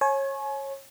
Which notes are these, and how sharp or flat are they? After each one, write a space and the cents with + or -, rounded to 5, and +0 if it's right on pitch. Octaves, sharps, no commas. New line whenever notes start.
C#5 -25 G#5 +30